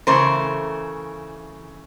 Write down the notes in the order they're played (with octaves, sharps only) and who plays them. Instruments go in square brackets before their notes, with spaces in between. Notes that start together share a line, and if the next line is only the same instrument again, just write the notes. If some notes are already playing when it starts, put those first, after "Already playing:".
[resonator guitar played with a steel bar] C#3 E3 A3 A#4 C5